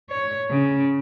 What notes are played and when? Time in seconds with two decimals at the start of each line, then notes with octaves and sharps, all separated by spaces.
0.11 C#5
0.51 C#3